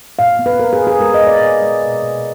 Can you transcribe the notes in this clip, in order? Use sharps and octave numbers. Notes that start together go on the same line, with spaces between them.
A#2 F5
B3
B4
A#2 A#4
G#4
A#2
G#4
G#3 A#4
D#5
A#2
D5
A#2
G#3
B2
B2